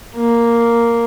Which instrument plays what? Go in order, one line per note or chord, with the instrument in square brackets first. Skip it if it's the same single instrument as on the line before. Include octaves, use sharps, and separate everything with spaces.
[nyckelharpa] A#3